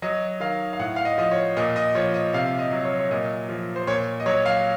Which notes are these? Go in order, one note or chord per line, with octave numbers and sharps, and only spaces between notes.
F#3 D#5
D#3 F5
F5
A2 F#5
F5
D#5
F3 D#5
C#5
A#2 D#5
D#5
F3 C#5
D#5
C3 F5
D#5
F#3
C#5
C#5
A#2 D#5
F3
C5
A#2 C#5
D#5
F#3 C#5
F5